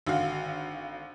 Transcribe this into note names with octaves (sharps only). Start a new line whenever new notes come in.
G#1 D3 F#4 F5